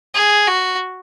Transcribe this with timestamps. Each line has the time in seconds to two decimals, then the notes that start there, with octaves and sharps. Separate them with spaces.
0.14 G#4
0.48 F#4